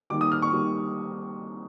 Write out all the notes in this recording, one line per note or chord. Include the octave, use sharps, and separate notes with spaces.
D#3 G3 A#3 D6
D#6
F6
C#6
D#3 G3 A#3